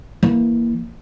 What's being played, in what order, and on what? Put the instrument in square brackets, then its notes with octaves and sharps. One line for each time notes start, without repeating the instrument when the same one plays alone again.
[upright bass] E3 A#3